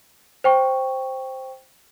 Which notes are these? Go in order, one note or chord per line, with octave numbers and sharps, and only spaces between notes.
C5 G5 C#6